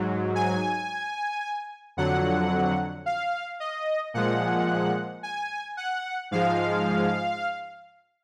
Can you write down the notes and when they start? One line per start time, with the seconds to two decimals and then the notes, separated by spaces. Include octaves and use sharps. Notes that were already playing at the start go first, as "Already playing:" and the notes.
Already playing: G#2 F#3
0.35 G#5
1.97 F2 D3 F#3 F#5
3.06 F5
3.60 D#5
4.14 A#2 F3 G#3 F#5
5.23 G#5
5.77 F#5
6.31 G#2 F3 G#3 F5